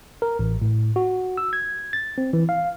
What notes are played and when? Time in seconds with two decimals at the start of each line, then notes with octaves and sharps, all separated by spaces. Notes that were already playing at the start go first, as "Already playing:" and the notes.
0.22 A#4
0.39 A1
0.62 A2
0.96 F#4
1.37 E6
1.53 G#6
1.93 A6
2.18 C4
2.33 E3
2.49 F5